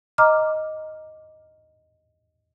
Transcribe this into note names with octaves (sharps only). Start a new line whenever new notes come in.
D#5 A#5 D6 F6